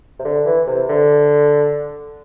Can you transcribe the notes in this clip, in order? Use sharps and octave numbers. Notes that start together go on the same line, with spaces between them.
C3
D3
E3
C3
D3